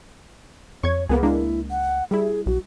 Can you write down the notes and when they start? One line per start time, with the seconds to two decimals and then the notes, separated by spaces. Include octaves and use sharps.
0.83 F2 C#5 C#6 G#6
1.09 C#2 A#3 B3 G#4 A#4
1.23 G#3 A#3 D4 E4
1.71 F#5
2.11 G3 E4 G#4
2.46 B1 F#4